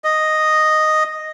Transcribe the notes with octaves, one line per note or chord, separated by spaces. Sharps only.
D#5